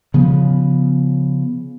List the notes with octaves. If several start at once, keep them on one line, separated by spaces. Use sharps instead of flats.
C#3 F3 B3